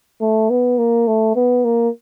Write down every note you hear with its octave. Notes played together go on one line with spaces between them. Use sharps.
A3
B3
A#3
A3
B3
A#3